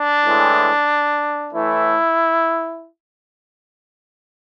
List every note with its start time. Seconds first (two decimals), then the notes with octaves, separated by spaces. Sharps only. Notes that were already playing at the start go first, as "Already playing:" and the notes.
Already playing: D4
0.25 A2 E3 G#3
1.52 A2 E3 A3 E4